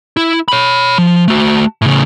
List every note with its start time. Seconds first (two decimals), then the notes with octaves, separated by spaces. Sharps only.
0.17 E4
0.48 C#5 B5
0.98 F3
1.28 A3 F#4
1.82 A2 C#3